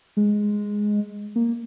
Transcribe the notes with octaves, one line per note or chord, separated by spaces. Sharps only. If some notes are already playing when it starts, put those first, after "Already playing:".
G#3
A#3